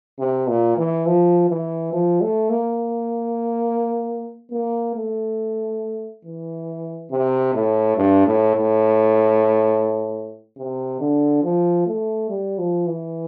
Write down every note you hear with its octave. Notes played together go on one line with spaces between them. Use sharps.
C3
A#2
E3
F3
E3
F3
A3
A#3
A#3
A3
E3
C3
A2
G2
A2
A2
C3
D3
F3
A3
G3
F3
E3